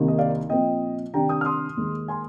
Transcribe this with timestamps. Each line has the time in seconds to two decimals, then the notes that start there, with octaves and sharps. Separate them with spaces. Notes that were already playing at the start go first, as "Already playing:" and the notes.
Already playing: C2 C3 D#3 A#3 D#4
0.08 D#5
0.19 D5 F5
0.49 A#2 F3 C4 D#5 G5
1.14 C3 D#3 G3 D4 G5 A#5
1.29 D#6 G6
1.41 F6
1.45 C6 D#6
1.77 D#2 D#3 G#3
2.08 G#5 C6